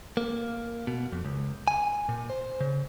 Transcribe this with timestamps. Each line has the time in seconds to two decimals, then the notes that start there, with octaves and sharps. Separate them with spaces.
0.17 A#3
0.87 B2
1.12 F2
1.25 C#2
1.68 G#5
2.09 A#2
2.30 C5
2.61 C#3